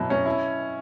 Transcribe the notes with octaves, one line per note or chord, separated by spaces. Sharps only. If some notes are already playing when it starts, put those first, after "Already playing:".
Already playing: B2 F#3 E4
C#4
E4